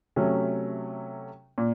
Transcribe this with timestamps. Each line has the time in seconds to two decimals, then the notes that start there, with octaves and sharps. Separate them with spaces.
0.16 C3 F#3 A3 C#4
1.58 A#2